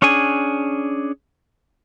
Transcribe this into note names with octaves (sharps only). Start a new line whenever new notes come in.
C#4 D4 G#4 G#5